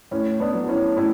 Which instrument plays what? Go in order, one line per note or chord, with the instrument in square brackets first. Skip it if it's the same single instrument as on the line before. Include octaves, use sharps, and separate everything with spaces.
[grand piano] A2 C#4
B3 D4
F#3
F#4
C#4 E4
A2 C#4 E4